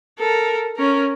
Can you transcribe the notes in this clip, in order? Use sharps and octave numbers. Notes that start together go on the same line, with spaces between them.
A4 A#4
C#4 A#4